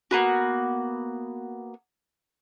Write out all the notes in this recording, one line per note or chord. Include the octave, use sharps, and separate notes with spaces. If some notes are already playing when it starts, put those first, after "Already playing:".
A#3 B3 F#4